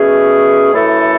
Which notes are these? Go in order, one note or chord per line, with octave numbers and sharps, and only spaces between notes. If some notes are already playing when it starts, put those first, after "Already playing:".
Already playing: B2 A3 C#4 G#4
F#2 E3 A3 E4 A4